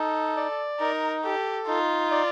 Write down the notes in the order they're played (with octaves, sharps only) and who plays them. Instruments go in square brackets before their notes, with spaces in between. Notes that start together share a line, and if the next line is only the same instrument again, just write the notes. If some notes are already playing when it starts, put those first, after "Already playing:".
Already playing: [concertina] D#4 [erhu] A4
[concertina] D5
[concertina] D#4 [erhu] A#4
[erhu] G4 [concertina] A4
[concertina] D#4 [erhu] F4
[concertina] D5